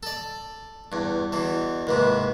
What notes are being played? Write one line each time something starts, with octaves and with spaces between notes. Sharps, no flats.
A4 D5
E2 G2
E2 B2 E3
D#2 G#2 C3 B4